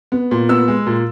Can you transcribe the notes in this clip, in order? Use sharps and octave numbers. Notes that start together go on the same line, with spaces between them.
B3
A#2
B3 E6
G#3
A#2